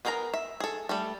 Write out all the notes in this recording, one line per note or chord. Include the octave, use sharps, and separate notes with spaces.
B3 G#4 A#4 G5 A#5
E5
G#4 A4
G3 A3 A4